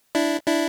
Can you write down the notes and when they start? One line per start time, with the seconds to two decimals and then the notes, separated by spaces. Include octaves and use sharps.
0.15 D4 E4
0.47 D4 E4